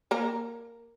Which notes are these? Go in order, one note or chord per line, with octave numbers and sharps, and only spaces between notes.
A#3 A#4